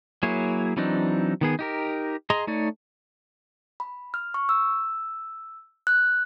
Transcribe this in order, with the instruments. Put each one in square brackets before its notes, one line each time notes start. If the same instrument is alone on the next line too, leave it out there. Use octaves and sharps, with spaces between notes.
[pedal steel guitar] F#3 A#3 E4 G#4 C#5
E3 F#3 C4 D4 D#4
D#3 B3 G#4
D#4 G4 A#4
G#4 D#5 A#5 C6
A3 D#4 C#5 D5
[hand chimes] B5
F6
C#6
E6
F#6